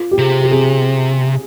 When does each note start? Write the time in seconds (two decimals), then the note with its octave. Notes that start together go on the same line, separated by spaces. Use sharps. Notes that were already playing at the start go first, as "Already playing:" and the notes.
Already playing: F4
0.11 G4
0.18 C3 G#4
0.43 G4
0.51 G#4